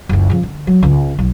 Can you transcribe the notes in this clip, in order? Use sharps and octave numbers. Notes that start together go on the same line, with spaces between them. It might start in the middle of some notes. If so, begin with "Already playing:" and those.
F#1 C#2
C#3 F3
D3
F#3
C#2 C#3
B1 F#3